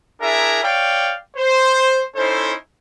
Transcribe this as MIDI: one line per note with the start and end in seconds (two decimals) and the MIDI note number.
0.21 0.62 62
0.21 0.62 64
0.21 0.62 68
0.21 0.62 70
0.21 0.62 76
0.21 0.62 82
0.64 1.14 73
0.64 1.14 74
0.64 1.14 77
0.64 1.14 79
1.37 2.02 72
2.16 2.54 61
2.16 2.54 63
2.16 2.54 64
2.16 2.54 69
2.16 2.54 72